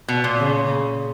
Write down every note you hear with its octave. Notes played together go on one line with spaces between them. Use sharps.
B2
A#2
C#3